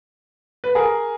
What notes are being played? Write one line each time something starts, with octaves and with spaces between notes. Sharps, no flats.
B4
G#4 A#4